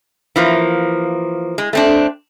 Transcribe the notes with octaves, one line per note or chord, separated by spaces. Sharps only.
E3 F3 A#3
G#3
A3 C4 D4